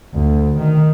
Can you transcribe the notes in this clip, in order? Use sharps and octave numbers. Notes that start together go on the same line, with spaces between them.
D2
D#3